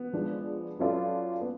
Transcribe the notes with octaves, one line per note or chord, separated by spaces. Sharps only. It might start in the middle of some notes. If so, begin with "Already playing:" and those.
Already playing: B3
F3 G#3 D4
F#3 C#4 F4 A4 D5
B3